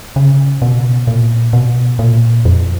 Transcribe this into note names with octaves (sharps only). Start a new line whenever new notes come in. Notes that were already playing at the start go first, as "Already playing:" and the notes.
C#3
B2
A#2
B2
A#2
F2